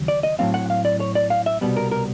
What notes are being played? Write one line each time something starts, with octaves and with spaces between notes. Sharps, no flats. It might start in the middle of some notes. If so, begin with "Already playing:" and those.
Already playing: D#2 C#3 F#3
D5
D#5
A2 F#3 A3 C4 F5
F#5
F5
D5
C#5
D5
F5
E5
C2 B2 G3 B3
A#4
A#4